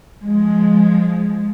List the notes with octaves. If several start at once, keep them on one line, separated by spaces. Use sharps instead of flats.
F3 G#3